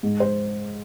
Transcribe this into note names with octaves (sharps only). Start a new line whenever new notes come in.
G#2
C5